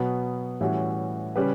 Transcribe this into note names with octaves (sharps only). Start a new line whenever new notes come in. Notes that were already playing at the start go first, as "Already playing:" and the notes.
Already playing: B2 F#3 B3
A2 E3 G3 C#4 F#4
C#3 G3 C#4 G4 B4